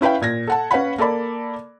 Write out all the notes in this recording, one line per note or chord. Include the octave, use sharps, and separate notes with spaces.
C#4 E4 B4 F5 G5
A#2 G#6 A#6
A4 F#5 A5
C#4 B4 C#5 F5 F#5 B5
A#3 A4 D5 B5